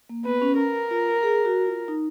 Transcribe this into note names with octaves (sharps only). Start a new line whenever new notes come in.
A#3
B3 B4
C#4
A#4
F4
G#4
F#4
F4
D#4